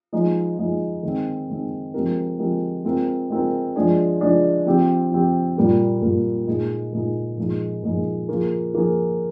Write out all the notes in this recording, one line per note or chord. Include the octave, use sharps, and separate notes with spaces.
F3 G#3 D#4
F3 G#3 D#4
D#3 G#3 C4
D#3 G#3 C4
F3 G#3 C4 G4 A#4
F3 G#3 C4 G4 A#4
G#3 C4 F4 A#4
G#3 C4 F4 A#4
F3 G#3 D4 G#4
F3 G#3 D4 G#4
F3 C4 G4
F3 C4 G4
A#2 G3 A#3 F4
A#2 G3 A#3 F4
A#2 G#3 D#4 G#4
A#2 G#3 D#4 G#4
A#2 F3 G#3 D#4 G#4
A#2 F3 G#3 D#4 G#4
F3 A#3 F4 G#4
F3 A#3 F4 G#4